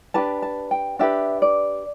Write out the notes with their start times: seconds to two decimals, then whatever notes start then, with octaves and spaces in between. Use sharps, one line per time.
0.14 D4 G4 B4 A5
0.42 A5
0.71 G5
0.99 D4 G4 B4 E5
1.42 D5